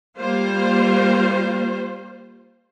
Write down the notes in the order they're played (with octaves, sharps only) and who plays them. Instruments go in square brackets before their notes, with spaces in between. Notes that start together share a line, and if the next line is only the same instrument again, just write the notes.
[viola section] G3 A#3 F4 C5